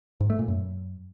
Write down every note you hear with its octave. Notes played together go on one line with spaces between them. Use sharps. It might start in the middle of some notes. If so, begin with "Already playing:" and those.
G#2
A3
A#2
F#2